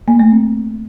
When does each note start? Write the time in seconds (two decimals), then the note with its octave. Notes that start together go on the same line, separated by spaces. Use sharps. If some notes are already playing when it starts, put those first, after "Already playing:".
0.08 A#3
0.20 A3
0.31 C4